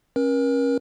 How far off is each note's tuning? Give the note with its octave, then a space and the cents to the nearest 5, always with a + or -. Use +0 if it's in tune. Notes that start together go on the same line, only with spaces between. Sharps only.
C#4 -25 A#4 +40